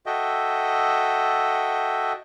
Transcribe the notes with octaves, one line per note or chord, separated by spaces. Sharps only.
F#4 A4 D#5 E5 G5